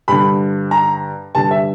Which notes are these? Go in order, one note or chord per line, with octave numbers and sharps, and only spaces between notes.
G2 D3 B5
A#5
G2 D3 A5
E5